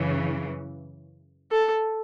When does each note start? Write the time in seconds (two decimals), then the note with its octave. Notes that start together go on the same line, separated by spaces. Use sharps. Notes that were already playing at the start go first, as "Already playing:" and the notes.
Already playing: F#2 C#3 E3
1.51 A4